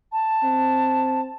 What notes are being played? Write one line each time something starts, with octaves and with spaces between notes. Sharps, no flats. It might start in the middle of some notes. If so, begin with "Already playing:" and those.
A5
C4